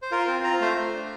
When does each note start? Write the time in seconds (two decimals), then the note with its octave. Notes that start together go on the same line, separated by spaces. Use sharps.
0.02 C5
0.11 F4 A#4
0.27 C4 C5
0.44 F4 A#5
0.61 A3 C5
0.77 A3
0.94 D4